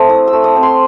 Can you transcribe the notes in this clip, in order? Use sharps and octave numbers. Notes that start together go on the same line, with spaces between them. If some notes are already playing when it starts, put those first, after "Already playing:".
Already playing: A3 C4
E4 D#6
E6
A3
D#6
C4
C6